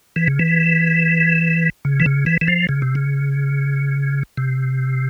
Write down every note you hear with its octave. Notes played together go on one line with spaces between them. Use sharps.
E3
C#3
E3
C#3
E3
C#3
E3
E3
F3
C#3
C3
C#3
C3